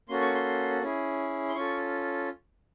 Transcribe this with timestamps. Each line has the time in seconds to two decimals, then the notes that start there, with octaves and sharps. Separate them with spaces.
0.09 A#3 C#4 F#4 A4 C6
0.21 C#6
0.35 C6
0.82 C#4 E4 G#4
1.49 C6
1.55 C#4 F4 A4 C#6